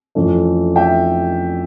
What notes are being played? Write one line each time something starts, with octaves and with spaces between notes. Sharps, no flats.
F2 E3 A3 C#4
E5 G5